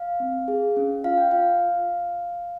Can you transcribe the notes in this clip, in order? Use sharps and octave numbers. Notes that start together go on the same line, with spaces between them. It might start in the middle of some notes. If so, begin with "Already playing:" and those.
Already playing: F5
C4
G#4
C#4
F4 F5
G5
F4 F5